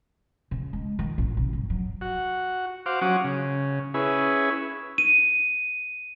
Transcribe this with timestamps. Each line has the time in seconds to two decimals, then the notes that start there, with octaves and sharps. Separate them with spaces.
0.51 C#3
0.73 G#3
0.99 D#3
1.18 A1
1.37 C3
1.53 G2
1.70 F#3
2.01 F#4
2.86 F#4 C5 F5 D6
3.02 F#3 C#4 F#4 D6 D#6
3.24 C#3
3.94 C#4 E4 G#4 B4
4.98 D#7